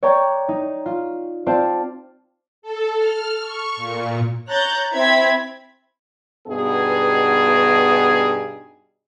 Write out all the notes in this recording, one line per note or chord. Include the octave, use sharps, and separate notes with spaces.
C#5 D5 G5 A#5 C#6 D6
D#4
F4
C4 F4 C5 D5 A5
A4
F6
C#6
A#2
C#5 A#5 F#6 G6 A6
C4 E4 G#6 B6
G2 B2 B3 D#4 G#4